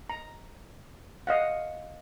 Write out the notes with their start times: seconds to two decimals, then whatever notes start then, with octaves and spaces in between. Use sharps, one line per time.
0.10 A#5
1.27 D#5 F5 F#5